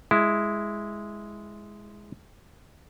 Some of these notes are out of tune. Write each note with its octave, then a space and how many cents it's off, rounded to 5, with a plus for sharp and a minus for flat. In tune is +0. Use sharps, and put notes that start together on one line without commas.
G#3 +0 E4 +0